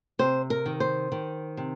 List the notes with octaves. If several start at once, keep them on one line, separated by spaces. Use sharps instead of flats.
C3 C5
A#4
D#3
C5
D#3
C3